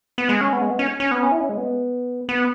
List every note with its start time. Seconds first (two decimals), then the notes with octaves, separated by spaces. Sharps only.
0.18 B3
0.29 G#3
0.41 C#4
0.53 B3
0.62 G#3
0.70 B3
0.79 C#4
1.00 C#4
1.11 B3
1.23 C#4
1.32 E4
1.40 C#4
1.49 G#3
1.58 B3
2.29 B3